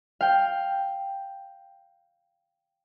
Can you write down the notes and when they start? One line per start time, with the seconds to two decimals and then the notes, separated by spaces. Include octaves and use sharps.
0.21 F5 G5